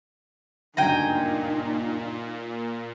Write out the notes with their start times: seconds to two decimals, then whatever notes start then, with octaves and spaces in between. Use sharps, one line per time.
0.77 F#1 D2 G2 A#2 D#4 G5 G#5 A#5